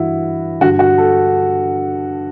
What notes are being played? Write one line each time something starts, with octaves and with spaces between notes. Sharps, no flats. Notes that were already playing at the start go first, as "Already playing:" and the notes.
Already playing: G2 E3 E4 F#4
G2 D3 F#4
F#4
A4